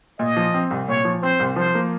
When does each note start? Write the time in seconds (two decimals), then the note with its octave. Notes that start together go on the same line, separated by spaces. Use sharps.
0.19 A#2 D#5
0.37 F3
0.54 C4
0.71 C2
0.88 A#2 C#5
1.05 F3
1.22 C4 C5
1.40 C2
1.56 F3 C5
1.75 A#3